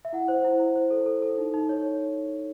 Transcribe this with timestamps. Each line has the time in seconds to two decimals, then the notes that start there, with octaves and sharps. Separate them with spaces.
0.05 E5
0.13 E4 F#5
0.28 C5
0.44 E4
0.60 E4
0.76 C5
0.91 A4
1.06 A4
1.22 A4
1.38 D#4
1.54 D#4
1.69 C#5